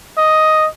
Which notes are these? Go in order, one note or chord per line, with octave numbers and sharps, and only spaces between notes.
D#5